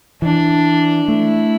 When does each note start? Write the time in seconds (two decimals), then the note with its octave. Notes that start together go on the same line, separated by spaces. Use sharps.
0.22 E3 D4
1.08 A3 E4